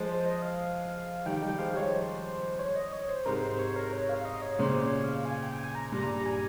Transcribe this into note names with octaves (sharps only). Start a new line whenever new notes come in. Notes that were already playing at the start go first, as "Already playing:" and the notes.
Already playing: F3 G#3
C5
D#5
F5
D#3 G3 G5
D#3 G3 G5
F3 G#3 F5
F3 G#3 C#5
C5
C#5
D#5
C#5
C5
G#2 C3 A#4
C5
C#5
A#4
C#5
F5
D#5
C#5
A#2 C#3 C5
C#5
F5
G#5
G5
G#5
A#5
G2 A#2 A#5
G#5